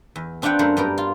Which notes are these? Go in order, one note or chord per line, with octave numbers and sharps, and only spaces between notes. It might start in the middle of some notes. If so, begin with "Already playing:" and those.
E2
C4 D4 F4 B4 F#5 G5
F#2 A3 A#4 C5 F#5
G2 B3 A#4 G5
F4